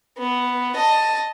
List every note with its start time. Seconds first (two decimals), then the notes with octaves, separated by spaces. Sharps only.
0.18 B3
0.76 D#5 A5